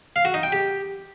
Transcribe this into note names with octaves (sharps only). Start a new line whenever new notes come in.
F5
F#4
D#4
G5
G4